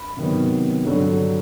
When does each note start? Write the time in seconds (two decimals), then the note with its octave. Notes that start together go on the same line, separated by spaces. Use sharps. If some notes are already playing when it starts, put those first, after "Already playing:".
Already playing: B5
0.17 C3 D#3 F#3 B3
0.85 G2 D3 F#3